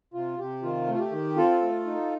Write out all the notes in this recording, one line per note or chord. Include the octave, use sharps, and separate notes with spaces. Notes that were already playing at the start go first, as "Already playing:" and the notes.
C3 F4
C3 G4
D#3 F4
A3
F4
G4
D#3
C4 F4 A4
A3
D#4